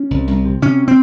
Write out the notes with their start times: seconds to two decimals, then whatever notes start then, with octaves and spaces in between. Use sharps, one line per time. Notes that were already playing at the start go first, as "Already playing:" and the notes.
Already playing: C#4
0.10 C2
0.27 C2
0.45 C3
0.62 C3 C#4
0.88 C4